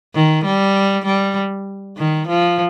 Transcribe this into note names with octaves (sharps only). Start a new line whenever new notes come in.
D#3
G3
G3
D#3
F3